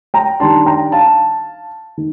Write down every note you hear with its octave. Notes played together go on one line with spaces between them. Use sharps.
G5 A#5
D#3 G3 D4 A5 C6
G5 A#5
F5 A5
D#3